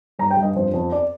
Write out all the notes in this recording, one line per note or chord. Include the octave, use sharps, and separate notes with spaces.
G2 A#5
G5
G2
D#5
F2 C5
F2
D5